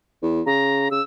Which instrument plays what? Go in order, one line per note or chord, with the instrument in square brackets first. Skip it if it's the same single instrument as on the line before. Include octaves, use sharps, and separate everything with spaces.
[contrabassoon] E2
[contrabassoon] C#3 [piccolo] A#5
[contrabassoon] C#3 [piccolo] E6